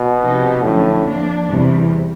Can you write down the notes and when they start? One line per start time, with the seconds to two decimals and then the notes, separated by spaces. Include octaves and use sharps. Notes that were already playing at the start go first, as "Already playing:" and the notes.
Already playing: B2
0.20 C3 F3 A#3 D#4 G4
0.62 F2 A2 D3 F#3 A3 C#4
1.04 F3 A#3 D4
1.48 E2 C3 E3 G3